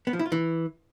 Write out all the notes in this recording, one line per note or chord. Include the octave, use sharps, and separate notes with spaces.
B3
F3
E4
F4
E3